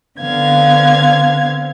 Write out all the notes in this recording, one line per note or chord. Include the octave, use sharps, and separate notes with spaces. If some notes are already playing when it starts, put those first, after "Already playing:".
D3 B3 C4 F5 G#6